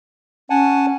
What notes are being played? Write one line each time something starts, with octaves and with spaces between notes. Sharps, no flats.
C#4 F#5 G#5 A5